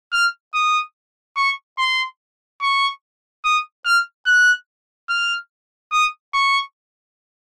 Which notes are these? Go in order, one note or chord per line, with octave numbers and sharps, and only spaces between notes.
F6
D#6
C#6
C6
C#6
D#6
F6
F#6
F6
D#6
C#6